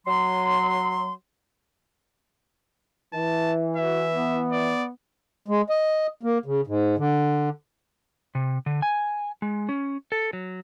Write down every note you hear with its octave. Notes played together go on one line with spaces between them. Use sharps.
F#3 C6
E3 A5
F#4 E5
B3
D5
G#3
D#5
A#3
C#3
G#2
D3
C3
D3
G#5
G#3
C#4
A4
F#3